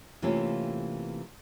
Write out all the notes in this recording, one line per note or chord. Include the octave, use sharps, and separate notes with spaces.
C3 E3 A3 A#3 C#4 F4